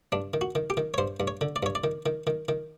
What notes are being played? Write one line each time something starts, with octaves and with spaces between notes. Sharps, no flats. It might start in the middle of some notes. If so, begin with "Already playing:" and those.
G2 D4
D#3
F#4
D#3
G4
D#3
C#5
G2 C5
G2
C#5
D3
D5
G2 C#5
D5
D#3
D#3
D#3
D#3